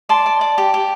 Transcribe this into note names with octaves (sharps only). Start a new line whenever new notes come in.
D5 A5 C6
D5
D5
G4
G4